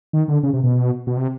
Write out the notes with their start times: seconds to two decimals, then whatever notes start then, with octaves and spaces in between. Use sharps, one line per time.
0.13 D#3
0.28 D3
0.43 C#3
0.53 C3
0.63 B2
1.07 B2
1.17 C3